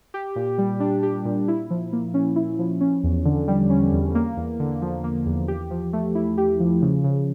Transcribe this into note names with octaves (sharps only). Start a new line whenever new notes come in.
G4
A#2
G3
D4
G4
A#2
E4
F3
A#3
C#4
E4
F3
C#4
E2
D3
G3
C#4
E2
A#3
E2
D3
F3
A#3
E2
G4
F3
A3
E4
G4
F3
C#3
C#3